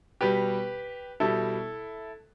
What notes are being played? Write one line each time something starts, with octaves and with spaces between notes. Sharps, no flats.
B2 G3 G4 B4
B2 G3 E4 A4